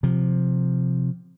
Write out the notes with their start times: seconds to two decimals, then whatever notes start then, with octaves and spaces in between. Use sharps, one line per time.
0.03 C3 F3